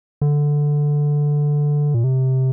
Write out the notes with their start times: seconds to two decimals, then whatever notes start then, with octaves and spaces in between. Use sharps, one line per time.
0.21 D3
1.94 A#2
2.04 C3